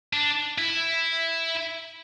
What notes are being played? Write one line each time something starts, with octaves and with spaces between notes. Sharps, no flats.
D4
E4